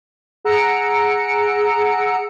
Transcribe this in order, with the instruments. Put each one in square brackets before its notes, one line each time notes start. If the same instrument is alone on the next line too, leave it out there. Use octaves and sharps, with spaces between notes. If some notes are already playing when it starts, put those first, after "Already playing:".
[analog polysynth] G#4 F#5 A#5 E6 C#7 D7